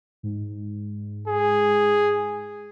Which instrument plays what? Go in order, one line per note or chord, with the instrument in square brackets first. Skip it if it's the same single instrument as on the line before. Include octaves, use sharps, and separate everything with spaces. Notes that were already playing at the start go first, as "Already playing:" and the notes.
[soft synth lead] G#2
[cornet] G#4